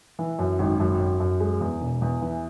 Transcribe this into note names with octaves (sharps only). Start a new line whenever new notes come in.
E3
F#2
G#1
F#2
F#2
F#2
G#3
E2
E1
E2
E3